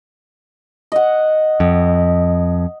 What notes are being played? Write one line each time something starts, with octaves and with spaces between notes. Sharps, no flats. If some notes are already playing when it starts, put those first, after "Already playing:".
D#5 F#5
F2